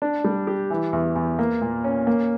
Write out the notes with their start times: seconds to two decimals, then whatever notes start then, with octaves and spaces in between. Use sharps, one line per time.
0.02 D4
0.24 G3
0.47 G4
0.70 E3
0.93 E2
1.16 E2
1.39 A#3
1.61 A#2
1.84 C#4
2.07 A#3